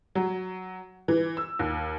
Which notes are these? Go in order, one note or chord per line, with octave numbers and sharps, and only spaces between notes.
F#3
E3
E6
D#2